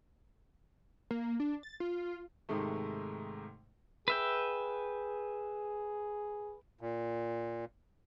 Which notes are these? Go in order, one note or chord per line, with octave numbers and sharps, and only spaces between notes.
A#3
D4
A6
F4
G#2 C3 D#3 G#3 A3
G#4 B4 E5 G5
A#2